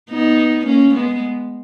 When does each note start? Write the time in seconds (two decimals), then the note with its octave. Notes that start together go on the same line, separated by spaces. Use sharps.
0.10 B3 D#4
0.66 A#3 C#4
0.95 G#3 B3